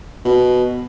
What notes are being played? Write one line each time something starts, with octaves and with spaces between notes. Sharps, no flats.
B2